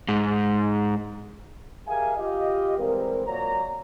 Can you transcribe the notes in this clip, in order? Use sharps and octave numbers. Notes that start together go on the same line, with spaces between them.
G#2
G4 G#4 A#4 E5 F5 G#5
F4 G4 D#5 F5
E3 G3 G#3 C4 A#4
A#2 F#3 A#3 C#5 D5 A#5